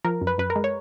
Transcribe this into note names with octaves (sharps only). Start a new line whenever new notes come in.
F3 A#4
F#2
B4
F#2 B4
A#4
G#3
C#5